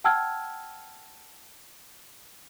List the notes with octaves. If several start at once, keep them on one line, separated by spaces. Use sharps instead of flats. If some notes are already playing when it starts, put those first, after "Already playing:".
F#5 G5 A5 E6 F6 G#6